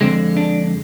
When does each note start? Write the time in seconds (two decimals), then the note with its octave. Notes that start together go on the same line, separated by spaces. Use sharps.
0.01 F2 D3 G#3 C4
0.37 D4